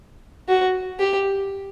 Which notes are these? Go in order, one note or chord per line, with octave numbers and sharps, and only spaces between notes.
F#4
G4